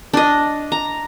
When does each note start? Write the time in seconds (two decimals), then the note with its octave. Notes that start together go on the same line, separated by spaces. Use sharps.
0.13 D4 D#5
0.72 A#5